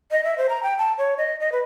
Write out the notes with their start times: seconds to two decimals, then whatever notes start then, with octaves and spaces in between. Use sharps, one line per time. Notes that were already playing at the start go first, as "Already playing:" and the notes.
0.11 D#5
0.24 E5
0.38 C5
0.49 A#5
0.63 G5
0.78 A5
0.98 C#5
1.18 D#5
1.40 D#5
1.52 B4